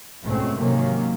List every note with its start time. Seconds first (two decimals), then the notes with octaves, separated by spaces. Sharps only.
0.22 C#2 G#2 B2 A3 C4 C#4
0.57 G#2 C3 D#3 F#3 A#3 C#4